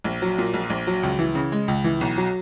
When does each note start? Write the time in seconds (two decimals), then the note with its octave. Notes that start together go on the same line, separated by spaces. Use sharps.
0.04 A#1
0.22 F#3
0.38 A#2
0.54 A#1
0.70 A#1
0.87 F#3
1.03 C#2
1.19 E3
1.35 C#3
1.52 G#3
1.68 C#2
1.84 E3
2.01 B1
2.17 F#3